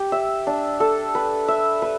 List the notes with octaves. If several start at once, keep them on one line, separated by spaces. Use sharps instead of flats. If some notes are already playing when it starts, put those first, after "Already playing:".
Already playing: G4
E5
D4
A4
B4
E5
B4